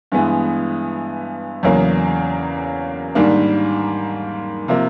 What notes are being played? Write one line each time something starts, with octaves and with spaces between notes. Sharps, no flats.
G2 E3 G#3 B3 E4
E2 C#3 F#3 A#3
G#2 D#3 G3 A#3 D4
C3 F3 A#3